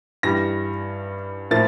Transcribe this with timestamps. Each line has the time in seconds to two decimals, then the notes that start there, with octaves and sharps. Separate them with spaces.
0.23 G2 E3 G3 A#6
1.51 A2 F3 A#3 A6